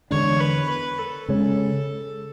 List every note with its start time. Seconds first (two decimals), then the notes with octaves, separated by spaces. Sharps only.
0.11 E2 D3 G#3 D4 C#5
0.40 B4
0.70 B4
0.99 A4
1.29 C#3 G#3 C#4